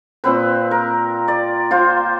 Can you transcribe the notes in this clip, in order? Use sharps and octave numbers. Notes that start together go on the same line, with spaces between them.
A#2 C4 B4
A#4
D5
F4 C5